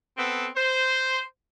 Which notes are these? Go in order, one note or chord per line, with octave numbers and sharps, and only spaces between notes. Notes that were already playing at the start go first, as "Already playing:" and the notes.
B3 C4 A4
C5